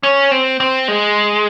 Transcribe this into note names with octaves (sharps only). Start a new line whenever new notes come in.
C#4
C4
C4
G#3